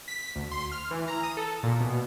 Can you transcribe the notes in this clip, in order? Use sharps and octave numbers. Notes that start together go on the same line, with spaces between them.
B6
D2
C6
F6
E3
A#5
D#6
A4
A#2
B2